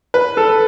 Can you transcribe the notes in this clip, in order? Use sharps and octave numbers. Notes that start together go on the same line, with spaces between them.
B4
A4